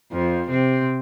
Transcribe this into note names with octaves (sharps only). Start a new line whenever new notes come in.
F2 F3
C3 C4